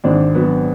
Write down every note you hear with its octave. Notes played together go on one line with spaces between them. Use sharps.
G#1 C4 D4
F#3 B3